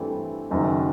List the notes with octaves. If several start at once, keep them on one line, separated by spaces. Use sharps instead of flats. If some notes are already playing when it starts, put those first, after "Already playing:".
Already playing: G2 E3 A3 C4
F#1 F#2 D#3